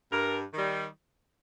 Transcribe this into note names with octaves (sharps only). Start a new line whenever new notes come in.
G2 A#4
D#3 G3